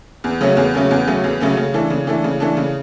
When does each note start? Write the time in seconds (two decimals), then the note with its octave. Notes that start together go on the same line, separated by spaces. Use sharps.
0.24 E2
0.41 C#3 F#3 A3 C#4
0.57 E2
0.74 C#3 F#3 A3 C#4
0.91 E2
1.07 C#3 F#3 A3 C#4
1.24 E2
1.40 C#3 F#3 A3 C#4
1.57 C#3
1.74 E3 A3 D4
1.90 C#3
2.07 E3 A3 D4
2.24 C#3
2.40 E3 A3 D4
2.57 C#3